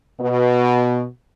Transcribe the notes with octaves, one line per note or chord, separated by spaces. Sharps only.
B2